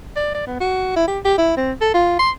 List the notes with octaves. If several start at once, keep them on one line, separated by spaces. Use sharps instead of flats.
D5
D5
B3
F#4
E4
G4
G4
E4
C4
A4
F4
C6